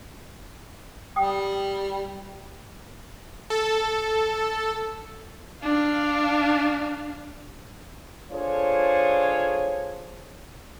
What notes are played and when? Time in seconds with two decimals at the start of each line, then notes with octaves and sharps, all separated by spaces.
1.16 G3 G5 D#6
3.50 A4
5.62 D4 F5
8.32 D4 F4 G#4 A4 C5 C#5